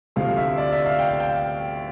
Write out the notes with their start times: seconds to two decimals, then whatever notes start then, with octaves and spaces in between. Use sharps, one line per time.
0.16 D2 C3 F3 A3 F5
0.37 E5
0.58 D5
0.72 E5
0.86 F5
0.99 G5
1.09 F5
1.20 G5